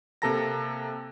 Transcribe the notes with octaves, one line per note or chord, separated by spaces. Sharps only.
C3 A#3 A4 A5 A#5 A#6